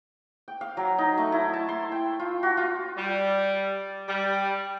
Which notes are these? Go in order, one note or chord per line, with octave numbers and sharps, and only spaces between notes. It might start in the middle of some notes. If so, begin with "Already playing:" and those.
G5
F5
F#3
D#4
A3
E4
A5
C6
G5
F4
F#4
F4
G3
G3